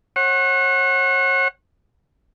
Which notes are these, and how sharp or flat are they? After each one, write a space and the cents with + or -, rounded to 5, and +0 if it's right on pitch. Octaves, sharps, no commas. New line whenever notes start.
C#5 -40 F#5 +0